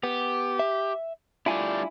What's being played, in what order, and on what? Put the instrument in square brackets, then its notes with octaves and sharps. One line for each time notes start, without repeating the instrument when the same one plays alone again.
[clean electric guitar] B3 [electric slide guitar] G4
[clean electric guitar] E5
[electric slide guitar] G3 A3 D4 [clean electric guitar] E4 F4 G#5